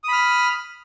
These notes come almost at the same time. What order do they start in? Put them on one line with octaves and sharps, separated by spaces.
D#6 B5 F6